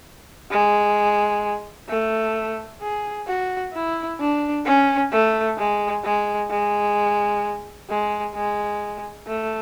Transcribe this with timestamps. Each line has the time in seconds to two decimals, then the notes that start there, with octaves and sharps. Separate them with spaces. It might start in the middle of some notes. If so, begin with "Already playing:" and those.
0.51 G#3
1.88 A3
2.81 G#4
3.27 F#4
3.74 E4
4.20 D4
4.65 C#4
5.12 A3
5.58 G#3
6.04 G#3
6.50 G#3
7.89 G#3
8.35 G#3
9.27 A3